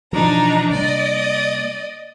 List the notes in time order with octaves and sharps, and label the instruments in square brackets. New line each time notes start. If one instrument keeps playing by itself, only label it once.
[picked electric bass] B2 E3 F3 [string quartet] D4 D#4 A#5
[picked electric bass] C3 G3 A#3 [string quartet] D5 D#5